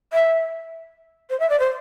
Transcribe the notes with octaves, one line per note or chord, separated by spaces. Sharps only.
E5
C5
E5
D5
C5